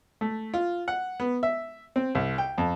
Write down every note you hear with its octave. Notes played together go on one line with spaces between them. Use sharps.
A3
F4
F#5
B3
E5
C4
C2
G5
F2